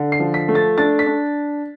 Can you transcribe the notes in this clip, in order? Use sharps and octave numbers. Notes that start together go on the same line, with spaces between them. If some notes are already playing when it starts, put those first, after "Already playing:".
Already playing: D3
C7
F3
B6
A3
A6
D4 A6
B6
D4